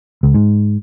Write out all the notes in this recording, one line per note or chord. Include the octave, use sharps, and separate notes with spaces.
C#2
G#2